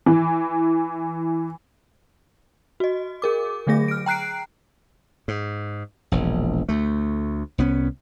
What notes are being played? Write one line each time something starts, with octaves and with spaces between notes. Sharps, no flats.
E3
F#4 D#5
G#4 A#4 D6
D3 F#3 A3 G#4 A#6
F6 D7
G5 A#5 F#6 C7 D7
G#2
E1 A#1
D2 A3
C2 B3 C#4